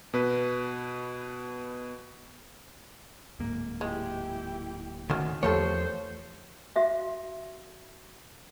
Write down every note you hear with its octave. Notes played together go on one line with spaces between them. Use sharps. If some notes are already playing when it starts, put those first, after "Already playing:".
B2 B4
D1 G#2 A#3
G#3 E4 G4
D2 D#3 C#4 F#4
E2 F3 A3 A#3 G4 A4 C5 C#5
F#4 E5 F5